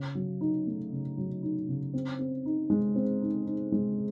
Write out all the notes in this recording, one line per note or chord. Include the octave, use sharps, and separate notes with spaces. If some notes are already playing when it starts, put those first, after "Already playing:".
Already playing: C#3
F#3
D#4
A3
C#3
F#3
D#4
C#3
C4
C4
D#4
G#3
C4
D#4
D#4
G#3